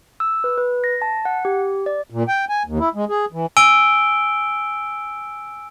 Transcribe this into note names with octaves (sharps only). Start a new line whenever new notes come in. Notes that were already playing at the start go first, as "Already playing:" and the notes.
E6
B4
B4
A#6
A5
F#5
G4
D5
A#2
G5
G#5
D#2
E4
G#3
G#4
E3
G#5 E6 D7 G7